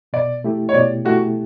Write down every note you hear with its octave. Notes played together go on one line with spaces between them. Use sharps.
B2 D5
A3 E4 G4
C#5
B2 D5
A3 E4 F#4 G4